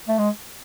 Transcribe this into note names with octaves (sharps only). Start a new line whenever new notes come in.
A3
G#3